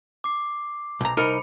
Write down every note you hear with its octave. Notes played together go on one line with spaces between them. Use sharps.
D6 C7
B1 A#5
C2 D#4 A#4 B5 C#7